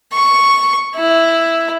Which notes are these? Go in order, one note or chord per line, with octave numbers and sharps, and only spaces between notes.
C#6
E4